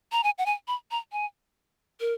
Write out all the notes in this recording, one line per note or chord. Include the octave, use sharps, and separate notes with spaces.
A#5
G#5
F#5
G#5
B5
A#5
G#5
A#4